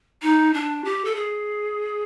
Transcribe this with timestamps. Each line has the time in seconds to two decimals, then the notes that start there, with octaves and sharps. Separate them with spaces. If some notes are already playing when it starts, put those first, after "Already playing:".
0.22 D#4
0.54 D4
0.85 G4
1.05 A4
1.15 G#4